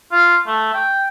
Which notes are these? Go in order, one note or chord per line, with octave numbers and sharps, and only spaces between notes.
F4
A3
G5